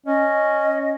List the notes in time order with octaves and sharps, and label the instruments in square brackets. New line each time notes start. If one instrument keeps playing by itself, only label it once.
[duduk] C#4 [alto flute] D#5